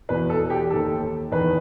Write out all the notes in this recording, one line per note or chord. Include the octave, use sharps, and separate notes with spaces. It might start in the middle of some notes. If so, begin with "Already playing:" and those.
E2 B2 B4
A4
G4
D#2 D#3 A4
E2 D#3 B4